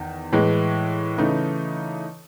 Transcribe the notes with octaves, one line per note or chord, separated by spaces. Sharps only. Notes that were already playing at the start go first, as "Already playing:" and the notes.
Already playing: E2 D#3
A2 E3 G#3
C#3 E3 A3 D#4